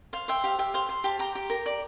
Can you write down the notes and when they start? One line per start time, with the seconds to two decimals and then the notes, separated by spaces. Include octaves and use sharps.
0.13 C5 F5
0.28 C5 E5 G5
0.44 G4 F5
0.59 G4 E5
0.74 C5 F5
0.89 C5
1.04 G4 A5 C6
1.19 G4 G5 A#5
1.35 G4
1.50 A#4
1.66 D5